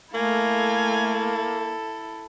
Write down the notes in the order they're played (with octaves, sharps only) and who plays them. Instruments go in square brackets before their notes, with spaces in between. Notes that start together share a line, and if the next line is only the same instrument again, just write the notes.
[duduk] A3 [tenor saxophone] A#3 [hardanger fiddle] E4 A4 [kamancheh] F5 G#5